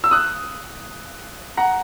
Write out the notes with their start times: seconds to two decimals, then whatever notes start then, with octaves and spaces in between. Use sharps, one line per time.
0.04 E6
0.11 D#6 F#6
1.57 F#5 A#5